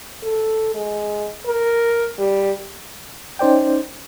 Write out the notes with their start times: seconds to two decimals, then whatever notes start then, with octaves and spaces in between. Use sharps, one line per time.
0.23 A4
0.74 G#3
1.46 A#4
2.19 G3
3.39 C#4 D#4 C5 D5 G5